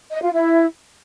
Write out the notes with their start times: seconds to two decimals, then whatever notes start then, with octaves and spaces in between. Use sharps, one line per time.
0.11 D#5
0.21 F4
0.31 E4